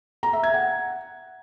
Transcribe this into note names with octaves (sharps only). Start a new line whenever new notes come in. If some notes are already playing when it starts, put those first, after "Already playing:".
A#5
E5
G#6
F#5